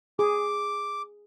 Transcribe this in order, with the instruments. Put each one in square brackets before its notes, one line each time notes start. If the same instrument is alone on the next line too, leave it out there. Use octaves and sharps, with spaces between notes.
[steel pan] G#4 [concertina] D6